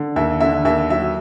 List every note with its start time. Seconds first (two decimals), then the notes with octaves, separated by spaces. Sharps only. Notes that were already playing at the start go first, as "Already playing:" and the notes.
Already playing: D3
0.16 D#2 E5
0.40 D3 E5
0.65 D#2 E5
0.90 F#3 E5